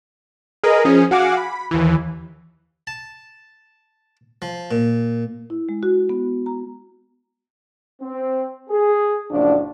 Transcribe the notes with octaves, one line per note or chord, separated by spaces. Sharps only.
G#4 A#4 B4 D#5
F3 C#4 G#4
F#4 F5 F#5 G#5 D6
B5
D#2 E3
A5
F3
A#2
E4
G#3
F#4
B3
A#5
C4
G#4
F#1 A2 F3 D4